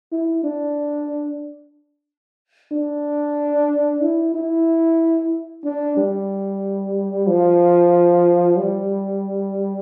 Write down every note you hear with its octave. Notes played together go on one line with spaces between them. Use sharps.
E4
D4
D4
E4
E4
D4
G3
F3
G3